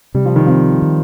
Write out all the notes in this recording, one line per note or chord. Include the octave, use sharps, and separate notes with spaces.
C3 G3
F3
D#3
F3 C4
D#3